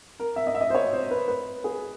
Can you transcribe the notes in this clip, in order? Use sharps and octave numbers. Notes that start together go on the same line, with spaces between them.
A#4
E5
D#5
E5
D#5
C5
C#5
C5
B4
B4
G#4